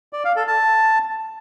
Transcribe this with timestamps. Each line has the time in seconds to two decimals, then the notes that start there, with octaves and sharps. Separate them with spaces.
0.13 D5
0.24 F5
0.36 A4
0.48 A5